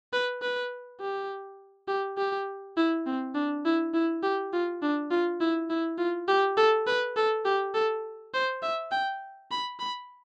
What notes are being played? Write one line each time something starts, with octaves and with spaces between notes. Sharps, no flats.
B4
B4
G4
G4
G4
E4
C4
D4
E4
E4
G4
F4
D4
F4
E4
E4
F4
G4
A4
B4
A4
G4
A4
C5
E5
G5
B5
B5